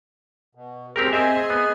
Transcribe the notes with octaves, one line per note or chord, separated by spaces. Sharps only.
B2
C4 G4 G#4 A#4
C4 G#4 D#5 E5 G#5
B3